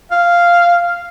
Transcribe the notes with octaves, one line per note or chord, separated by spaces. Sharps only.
F5